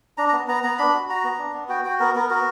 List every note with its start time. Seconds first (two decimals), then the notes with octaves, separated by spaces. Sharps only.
0.17 D4 A#5
0.29 A#5
0.33 B3
0.48 B3 A#5
0.64 B3 A#5
0.78 D4 B5
0.94 F#4
1.09 F#4 A#5
1.24 B3
1.39 D4
1.54 B3
1.69 F#4 G5
1.84 F#4 G5
2.00 B3 A#4
2.15 B3 A#4
2.30 F#4 A#4